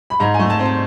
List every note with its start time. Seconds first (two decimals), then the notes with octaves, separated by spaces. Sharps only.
0.10 B5
0.20 G#2 A#5
0.34 G#5
0.39 A3
0.50 A5
0.59 C4
0.65 A5